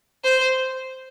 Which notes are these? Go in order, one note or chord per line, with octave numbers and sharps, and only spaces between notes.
C5